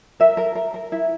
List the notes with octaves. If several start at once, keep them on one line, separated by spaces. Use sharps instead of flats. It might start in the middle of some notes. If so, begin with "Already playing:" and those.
A#4 E5
A#4
A#4
A#4
E4